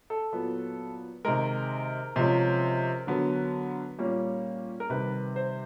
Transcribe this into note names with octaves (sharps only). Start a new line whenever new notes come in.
A4
A#2 F#3 B3
C3 D#3 G#3 A#4
C3 F3 G#3 C#4
D3 F#3 B3
A#2 G3 A#3 C#4
A#4
C3 D#3 G3 B4
C5